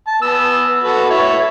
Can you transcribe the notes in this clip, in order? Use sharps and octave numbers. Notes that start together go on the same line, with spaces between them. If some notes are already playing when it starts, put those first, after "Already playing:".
A5
B3 E6
F#4 A4 B4
E4 C#5